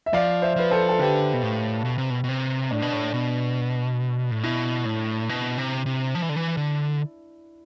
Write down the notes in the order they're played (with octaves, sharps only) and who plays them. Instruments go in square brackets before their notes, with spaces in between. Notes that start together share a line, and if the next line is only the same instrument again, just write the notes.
[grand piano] E5
[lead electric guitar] F3 [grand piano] D5 F5
[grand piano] C5 E5
[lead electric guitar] F3 [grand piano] B4
[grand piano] A4 C5
A4
[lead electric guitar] D3 [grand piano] G4 B4
[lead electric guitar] B2
A2
B2
C3
B2
B2
C3
[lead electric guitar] A2 [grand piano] D4
[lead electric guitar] B2
A2
B2
A2
[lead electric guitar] B2 [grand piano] E4
[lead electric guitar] A2
B2
C3
C3
F3
E3
D3
E3
D3